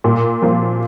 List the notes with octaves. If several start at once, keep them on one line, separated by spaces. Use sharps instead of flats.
A#2
F3 A#3 F4